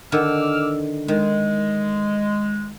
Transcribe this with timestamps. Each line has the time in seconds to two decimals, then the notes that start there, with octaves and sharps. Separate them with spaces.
0.12 D3 D#3 D6 E6 F6
1.08 D#3 G#3